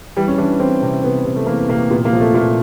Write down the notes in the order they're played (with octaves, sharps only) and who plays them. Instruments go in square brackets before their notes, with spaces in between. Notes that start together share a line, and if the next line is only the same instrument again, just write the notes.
[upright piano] E3 G3
C#4
E3 D4
E3 C4
C3
C3 B3
C3
A3
E3 A#3
C3 A#3
A#2 B3
A#3
F3
A3
A#2 A3